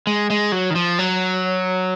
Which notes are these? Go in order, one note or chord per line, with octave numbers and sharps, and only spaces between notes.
G#3
G#3
F#3
D#3
F3
F#3